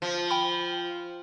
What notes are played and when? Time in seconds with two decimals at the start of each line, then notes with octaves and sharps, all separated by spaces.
0.02 F3
0.31 G5 B5